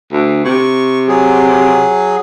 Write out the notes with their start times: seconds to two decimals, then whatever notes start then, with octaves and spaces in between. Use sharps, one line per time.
0.12 D2
0.45 C3 C#6
1.08 F#3 G#4